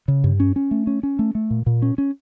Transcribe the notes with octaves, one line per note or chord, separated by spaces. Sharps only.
C#3
G2
C#4
C#4
A3
C#4
C#4
A3
A3
A#2
A#2
C#4
C#4